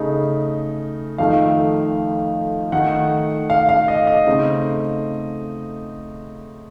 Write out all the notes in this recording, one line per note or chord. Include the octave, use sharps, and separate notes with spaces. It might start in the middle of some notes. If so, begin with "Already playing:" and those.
Already playing: C#3 A3 D#4
F2 D#3 A3 D#4 F5
D#3 A3 D#4 F#5
F5
F5
D#5
D#5
C#3 A3 C4 D#4